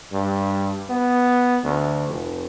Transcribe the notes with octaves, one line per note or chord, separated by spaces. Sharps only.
G2
B3
D2
F1